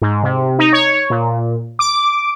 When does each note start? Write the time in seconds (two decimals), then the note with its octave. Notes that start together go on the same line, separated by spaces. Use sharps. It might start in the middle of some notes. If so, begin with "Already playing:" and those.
0.02 G#2
0.23 C3
0.59 D#4
0.73 C#5
1.10 A#2
1.79 D6